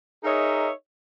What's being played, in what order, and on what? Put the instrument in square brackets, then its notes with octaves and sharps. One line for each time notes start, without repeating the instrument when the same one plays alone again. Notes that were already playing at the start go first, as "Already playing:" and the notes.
[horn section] D#4 G#4 A#4 C#5 D#5 E5